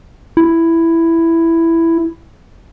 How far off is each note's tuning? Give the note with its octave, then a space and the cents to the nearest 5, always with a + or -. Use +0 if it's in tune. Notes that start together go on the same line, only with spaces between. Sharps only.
E4 +5